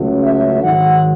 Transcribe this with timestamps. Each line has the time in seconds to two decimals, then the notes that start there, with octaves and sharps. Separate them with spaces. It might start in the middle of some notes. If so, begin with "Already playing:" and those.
Already playing: C#2 C#3 F#3 A3
0.20 E5
0.63 G#2 D#3 F#3 F#5